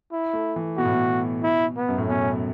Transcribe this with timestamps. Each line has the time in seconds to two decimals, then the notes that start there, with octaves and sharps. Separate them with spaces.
0.12 E4
0.33 A3
0.56 E3
0.78 B2 F#4
0.85 A2
0.93 B2
1.43 E4
1.77 B3
1.88 F#2
1.98 A2
2.09 B2 C#4